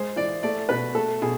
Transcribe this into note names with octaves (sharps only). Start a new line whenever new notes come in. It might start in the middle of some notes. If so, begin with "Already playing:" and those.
Already playing: G#3 C5
E3 D5
A3 D5
B2 B4
A3 A4
B2 G#4